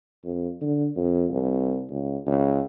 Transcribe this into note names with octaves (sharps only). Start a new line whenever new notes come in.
F2
D3
F2
C2
C#2
C#2